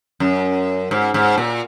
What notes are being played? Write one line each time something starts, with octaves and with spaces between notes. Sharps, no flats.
F#2
G#2
G#2
A#2